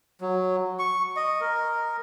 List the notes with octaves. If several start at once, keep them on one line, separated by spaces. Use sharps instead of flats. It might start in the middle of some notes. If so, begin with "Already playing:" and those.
F#3
C#6
D#5
A#4